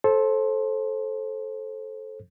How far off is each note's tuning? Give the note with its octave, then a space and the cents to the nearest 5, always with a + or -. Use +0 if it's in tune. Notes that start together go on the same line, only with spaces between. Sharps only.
A4 -10 C5 +20